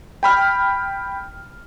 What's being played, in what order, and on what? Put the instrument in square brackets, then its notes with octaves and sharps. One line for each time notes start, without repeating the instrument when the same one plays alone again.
[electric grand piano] G5 B5 F6